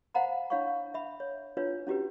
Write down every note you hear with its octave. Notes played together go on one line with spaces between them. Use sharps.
C5 F5 F#5 A#5 B5
D4 E4 C#5 F5 B5 C#6
E5 B5
C#5
D4 E4 F4 B4 C#5
C#4 E4 F#4 G4 B4